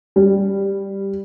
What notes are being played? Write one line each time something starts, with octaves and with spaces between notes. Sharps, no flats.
G3